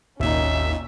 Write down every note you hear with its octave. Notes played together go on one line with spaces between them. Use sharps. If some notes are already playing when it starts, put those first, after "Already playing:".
G#1 D#2 A#2 C#4 D#4 E5